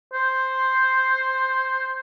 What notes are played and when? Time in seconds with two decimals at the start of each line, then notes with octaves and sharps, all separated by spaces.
0.13 C5